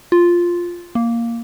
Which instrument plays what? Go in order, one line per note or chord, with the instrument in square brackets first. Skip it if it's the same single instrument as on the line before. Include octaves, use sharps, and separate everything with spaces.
[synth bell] F4
A#3